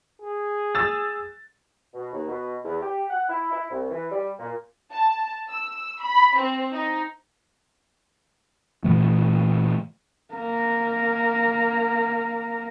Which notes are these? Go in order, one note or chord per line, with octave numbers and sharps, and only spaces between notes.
G#4
E6 A6
B2
D#2
B2
E2
G4
F#5
E4
E4
C2
E3
G3
A#2
A5
E6
B5
C4
D#4
A#2 E3 A3
A#3 A#5